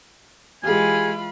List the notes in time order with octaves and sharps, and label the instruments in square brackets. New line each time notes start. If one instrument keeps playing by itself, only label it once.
[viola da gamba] E3 G#3 [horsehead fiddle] F4 B5 [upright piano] G4 G#4 [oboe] G#5